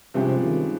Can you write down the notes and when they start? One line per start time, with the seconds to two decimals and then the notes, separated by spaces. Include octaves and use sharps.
0.14 G2 C3 F3 G#3 C#4 G4
0.44 D#3